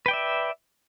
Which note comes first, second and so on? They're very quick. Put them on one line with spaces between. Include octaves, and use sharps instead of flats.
B4 G5 D5 E5